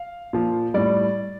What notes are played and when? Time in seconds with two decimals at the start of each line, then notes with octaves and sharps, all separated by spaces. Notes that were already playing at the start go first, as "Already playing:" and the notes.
Already playing: F5
0.33 A#2 F3
0.74 A2 G3 D5